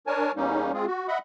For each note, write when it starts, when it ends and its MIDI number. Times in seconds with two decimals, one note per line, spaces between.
0.07 0.32 62
0.07 0.32 70
0.07 0.32 73
0.07 0.32 80
0.07 0.32 81
0.36 0.72 40
0.36 0.72 55
0.36 0.72 58
0.36 0.72 61
0.36 0.72 63
0.73 0.86 56
0.73 0.86 60
0.73 0.86 65
0.73 0.86 68
0.87 1.07 66
1.08 1.18 75
1.08 1.18 76
1.08 1.18 78
1.08 1.18 83